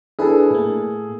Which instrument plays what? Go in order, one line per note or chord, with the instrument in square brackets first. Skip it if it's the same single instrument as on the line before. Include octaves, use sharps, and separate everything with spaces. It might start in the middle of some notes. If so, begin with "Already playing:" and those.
[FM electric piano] D4 E4 B4 [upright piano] G#4 A4
[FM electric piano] A2 A#3